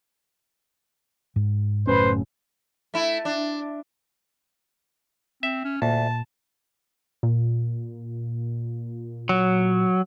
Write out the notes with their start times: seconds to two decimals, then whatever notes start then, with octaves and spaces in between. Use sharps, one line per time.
1.36 G#2
1.87 F#1 A2 C#4 B4 C5
2.94 A3 E4
3.25 D4
5.43 C4 E5
5.65 C#4
5.82 D2 A#2 A5
7.23 A#2
9.29 F#3